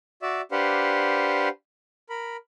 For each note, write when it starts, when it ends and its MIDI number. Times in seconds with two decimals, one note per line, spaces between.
0.22 0.41 66
0.22 0.41 74
0.22 0.41 76
0.52 1.49 62
0.52 1.49 67
0.52 1.49 71
0.52 1.49 72
0.52 1.49 77
0.52 1.49 78
2.10 2.37 70
2.10 2.37 83